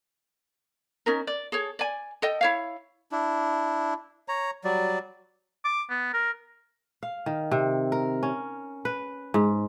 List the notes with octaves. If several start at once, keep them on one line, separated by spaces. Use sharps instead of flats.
C#4 D#4 A#4
D5
G#4 A4 C#5
D5 G#5
A4 D#5 G5
E4 C#5 F5
D4 E4
C#5 A#5
F#3 G3 D5
D6
B3
A#4
F5
D#3
C3
A#4
C#4
B4
G#2